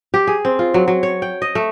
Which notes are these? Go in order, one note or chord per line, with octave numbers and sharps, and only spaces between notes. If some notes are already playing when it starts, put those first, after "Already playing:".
G4
G#4
C4
F4
F#3
F#3
C#5
G5
D#5
A3